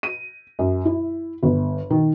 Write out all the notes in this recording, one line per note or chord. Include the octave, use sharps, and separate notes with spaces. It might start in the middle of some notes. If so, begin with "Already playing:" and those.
D#7
F#2
E4
G1
D#3